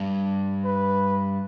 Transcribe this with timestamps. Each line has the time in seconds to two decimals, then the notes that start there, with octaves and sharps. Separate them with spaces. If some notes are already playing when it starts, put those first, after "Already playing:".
Already playing: G2
0.65 B4